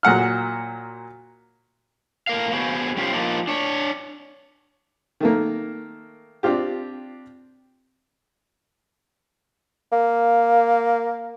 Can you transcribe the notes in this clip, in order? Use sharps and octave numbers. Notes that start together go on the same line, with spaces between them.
A#2 F#3 F#5 F6
A2 A#4 F5
B3 F#4 G#4 C5
G3 C#4 F4 G4 C5
F3 A#3 D#4 F4
D4 C#5
D#3 A3 A#3
C4 D4 F4 G4
A#3